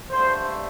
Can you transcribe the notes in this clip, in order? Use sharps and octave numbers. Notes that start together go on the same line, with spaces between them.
G2 D3 A3 C5